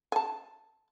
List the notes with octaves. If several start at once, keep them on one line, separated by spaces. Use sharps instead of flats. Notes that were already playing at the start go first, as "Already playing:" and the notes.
G#5 A5